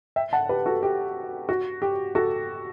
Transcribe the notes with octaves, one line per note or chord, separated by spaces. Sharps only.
E5 G5
F#5 A5
G4 B4
F#4 A4
G4
F#4
G4
F#4 A4